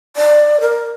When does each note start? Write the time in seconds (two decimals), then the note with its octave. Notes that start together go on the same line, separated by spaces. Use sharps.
0.16 D5
0.61 A#4